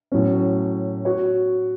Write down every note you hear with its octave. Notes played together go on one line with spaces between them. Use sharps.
A2 F#3 C#4
F#4 C#5